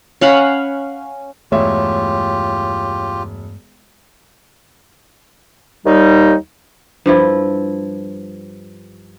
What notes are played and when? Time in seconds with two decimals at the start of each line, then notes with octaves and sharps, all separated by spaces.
0.21 C#4 F5 F#5 B5
1.52 E1 G2 A3 F4 G4 C#5 E5
5.85 D#2 G3 D#4
7.06 G2 F3 E4